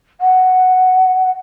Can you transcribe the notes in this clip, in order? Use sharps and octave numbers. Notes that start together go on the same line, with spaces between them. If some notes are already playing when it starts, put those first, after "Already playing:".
F#5